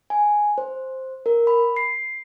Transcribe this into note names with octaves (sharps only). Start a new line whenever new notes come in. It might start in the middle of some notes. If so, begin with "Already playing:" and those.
G#5
C5
A#4
B5
C7